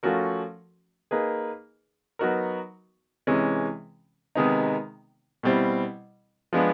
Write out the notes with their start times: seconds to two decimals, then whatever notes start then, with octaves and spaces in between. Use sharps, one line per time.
0.03 F3 A3 C#4 F#4 A#4
1.11 A#3 D#4 G#4 B4
2.19 F#3 B3 D#4 F#4 A#4
3.27 C3 E3 G#3 C#4
4.35 C3 D#3 G#3 B3 D#4
5.43 B2 G3 C4 E4
6.53 F3 G#3 B3 D4